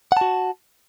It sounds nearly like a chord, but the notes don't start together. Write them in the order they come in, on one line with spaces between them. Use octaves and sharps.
F#5 A5 F#4